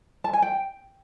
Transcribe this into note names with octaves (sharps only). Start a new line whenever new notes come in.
A5
G#5
G5